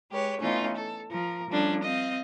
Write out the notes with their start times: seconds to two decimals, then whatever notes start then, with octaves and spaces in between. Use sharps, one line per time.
0.11 G#3 G4 B4 C#5
0.41 E3 A3 B3 C#4 D#4 F4
0.76 A4
1.11 F3 A#4
1.49 F3 G3 A3 C#4 D4
1.82 C4 D#5 F5